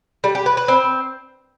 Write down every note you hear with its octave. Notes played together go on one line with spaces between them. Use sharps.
G3
G4
B4
B4
C4